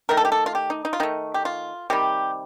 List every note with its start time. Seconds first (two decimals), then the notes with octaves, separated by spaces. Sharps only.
0.09 D#3 A3 A#4
0.17 A4
0.25 G4
0.32 A4
0.46 F4
0.55 G4
0.70 D#4
0.85 D#4
0.93 F4
1.00 D#3 A3 D#4
1.34 G4
1.45 F4
1.90 C3 D#3 G3 G4